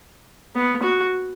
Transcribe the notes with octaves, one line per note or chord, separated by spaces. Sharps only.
B3
F#4